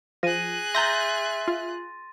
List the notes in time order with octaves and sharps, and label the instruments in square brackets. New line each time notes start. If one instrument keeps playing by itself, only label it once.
[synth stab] F3 [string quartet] G#4 F#6 [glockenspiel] A#6 D#7
[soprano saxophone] E5 [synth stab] A#5 G6 A#6 [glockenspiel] C6 A6
[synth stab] F4